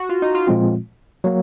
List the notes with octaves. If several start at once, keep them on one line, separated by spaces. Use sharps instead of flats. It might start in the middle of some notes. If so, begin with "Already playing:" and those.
Already playing: F#4
F4
D#4
F4
A#2 F3 G#3 C4 F4
F#3 A#3